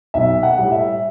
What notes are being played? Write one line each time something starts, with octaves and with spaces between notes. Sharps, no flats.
B1 E5
F#5
A2 G3
E5